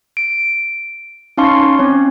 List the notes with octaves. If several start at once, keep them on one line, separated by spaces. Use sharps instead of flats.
D7
C#4 D#4 F5 A5 C6 C#6
C4 C#4 C#5